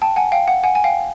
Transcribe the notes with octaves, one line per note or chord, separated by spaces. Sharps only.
G5 A5
F#5 G#5
F5 G5
F#5
F#5 G#5
G#5
F5 G5